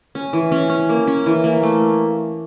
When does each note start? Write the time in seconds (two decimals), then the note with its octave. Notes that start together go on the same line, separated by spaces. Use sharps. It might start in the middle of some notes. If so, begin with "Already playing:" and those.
0.15 C#4
0.33 E3
0.52 C#4
0.70 C#4
0.89 A#3
1.07 C#4
1.26 E3
1.44 A#3
1.63 A3